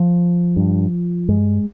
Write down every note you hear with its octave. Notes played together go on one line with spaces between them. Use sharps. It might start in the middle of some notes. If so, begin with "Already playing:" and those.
Already playing: F3
G2
G2 G#3